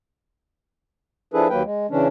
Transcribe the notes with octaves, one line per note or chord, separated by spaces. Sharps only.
F3 D4 E4 G#4 A4 B4
D#2 F#3 A#3 B4 G5
G#3
C#3 E3 C#4 D4